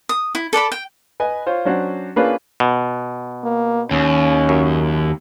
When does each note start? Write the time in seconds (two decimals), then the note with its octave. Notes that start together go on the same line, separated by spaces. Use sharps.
0.09 D#6
0.35 E4
0.53 A4 D5 A5 B5
0.72 G5
1.20 B4 D#5 G#5
1.46 F4 C5 C#5
1.65 F#3 C#4 D4 F#4 C5 F#5
2.16 A#3 C#4 D4 F4 G#4 B4
2.60 B2
3.44 A#3
3.91 D#2 C#4
4.49 F#2